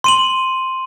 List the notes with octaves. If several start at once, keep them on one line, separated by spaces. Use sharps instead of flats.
C6 D#7 F#7